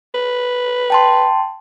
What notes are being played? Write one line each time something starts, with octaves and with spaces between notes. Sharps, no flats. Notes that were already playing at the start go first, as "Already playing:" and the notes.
B4
G5 A5 C6